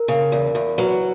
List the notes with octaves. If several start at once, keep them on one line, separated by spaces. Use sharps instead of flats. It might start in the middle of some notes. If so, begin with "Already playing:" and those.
Already playing: A#4
C#3
E2
E2
F#3 B4